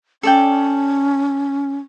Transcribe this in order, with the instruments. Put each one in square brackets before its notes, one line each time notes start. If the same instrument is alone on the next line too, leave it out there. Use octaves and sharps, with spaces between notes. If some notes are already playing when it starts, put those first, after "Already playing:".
[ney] C#4 [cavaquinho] A4 D5 G5